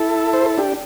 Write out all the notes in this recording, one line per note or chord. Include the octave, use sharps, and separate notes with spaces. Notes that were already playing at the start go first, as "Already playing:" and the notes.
Already playing: E4 A4
C5
A4
D4 G4